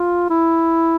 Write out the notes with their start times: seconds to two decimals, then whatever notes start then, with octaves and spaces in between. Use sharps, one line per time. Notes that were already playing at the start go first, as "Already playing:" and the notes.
Already playing: F4
0.30 E4